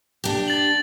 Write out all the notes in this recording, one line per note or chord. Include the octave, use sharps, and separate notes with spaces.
D4 G4
A6 F#7